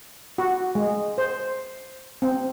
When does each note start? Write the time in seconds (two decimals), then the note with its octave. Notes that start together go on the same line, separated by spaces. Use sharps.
0.38 F#4
0.75 G#3
1.18 C5
2.22 C4